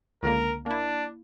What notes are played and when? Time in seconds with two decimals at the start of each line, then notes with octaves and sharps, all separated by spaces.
0.23 C#2 D3 A#3 A#4
0.66 A#3 D4 E4